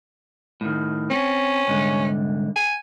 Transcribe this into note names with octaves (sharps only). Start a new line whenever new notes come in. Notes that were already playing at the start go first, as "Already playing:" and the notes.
A2 D#3
C4 C#4
C2 G#2 D3
G#5